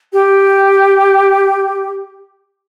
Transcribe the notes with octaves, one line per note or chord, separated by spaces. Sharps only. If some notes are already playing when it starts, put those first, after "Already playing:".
G4